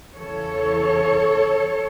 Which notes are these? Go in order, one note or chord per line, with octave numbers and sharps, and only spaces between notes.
E2 C#3 E3 A4 C#5